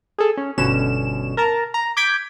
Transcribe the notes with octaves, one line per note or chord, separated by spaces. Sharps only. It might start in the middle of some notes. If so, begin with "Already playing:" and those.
G#4 A4
C#4
G1 B2 D3 C#4 E7
A#4 A5 A#5
A#5
D6 G6 G#6 B6 D7